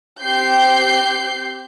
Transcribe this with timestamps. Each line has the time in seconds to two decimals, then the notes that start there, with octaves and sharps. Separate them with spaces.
0.22 C4 G4 G6 C7